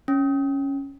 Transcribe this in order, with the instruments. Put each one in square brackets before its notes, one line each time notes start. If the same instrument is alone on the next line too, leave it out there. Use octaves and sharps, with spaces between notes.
[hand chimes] C#4